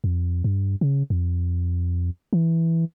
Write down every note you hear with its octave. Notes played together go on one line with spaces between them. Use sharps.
F2
G2
C#3
F2
E3